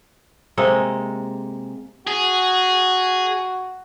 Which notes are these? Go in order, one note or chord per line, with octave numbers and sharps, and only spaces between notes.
C3 G#3 A#3 A4
F#4 G#4